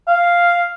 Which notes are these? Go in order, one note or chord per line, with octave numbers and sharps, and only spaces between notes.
F5